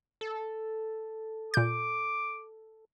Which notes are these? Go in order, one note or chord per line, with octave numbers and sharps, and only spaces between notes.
A4
A#2 D6 G6